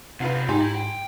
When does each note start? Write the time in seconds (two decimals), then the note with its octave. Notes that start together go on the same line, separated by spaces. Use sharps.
0.20 E2 C3 F4 B4 F5 F#5
0.49 G#2 D#4 G4 G#5 C6
0.61 E4
0.75 G5